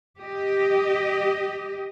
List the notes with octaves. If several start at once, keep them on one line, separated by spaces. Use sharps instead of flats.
G4 D#5